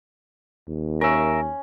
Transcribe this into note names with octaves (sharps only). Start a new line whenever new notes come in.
D#2
C#4 A#4 E5